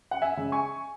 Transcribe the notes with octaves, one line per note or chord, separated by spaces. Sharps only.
F#5
E5 G#5
C#3 G#3
G#5 C#6